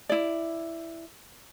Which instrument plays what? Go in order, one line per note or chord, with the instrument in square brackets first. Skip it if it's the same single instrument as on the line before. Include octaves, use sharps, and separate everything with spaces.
[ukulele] E4 D5